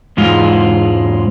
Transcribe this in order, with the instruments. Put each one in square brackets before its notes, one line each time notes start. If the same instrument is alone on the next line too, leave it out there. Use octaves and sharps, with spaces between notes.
[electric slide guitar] E2 G#2 G#3 F4